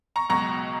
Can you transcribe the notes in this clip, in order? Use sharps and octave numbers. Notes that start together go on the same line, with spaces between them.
A#5 C#6
C#2 B2 F#3 A#5 C#6